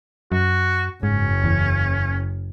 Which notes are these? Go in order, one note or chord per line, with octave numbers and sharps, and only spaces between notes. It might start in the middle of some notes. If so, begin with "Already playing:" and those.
F#2 F#4
F#1 G#2 C#4
E2